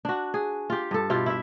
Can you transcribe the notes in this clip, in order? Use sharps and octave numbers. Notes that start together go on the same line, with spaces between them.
D4 F#4
G#4
F4 G4
G2 A4
B2 E4 F4 G4
E4 E5